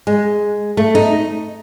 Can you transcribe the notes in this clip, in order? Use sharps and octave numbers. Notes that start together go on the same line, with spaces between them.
G#3
A3
D#4